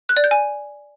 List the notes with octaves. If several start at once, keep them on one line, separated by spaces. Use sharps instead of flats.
F#6
D5
G6
G#5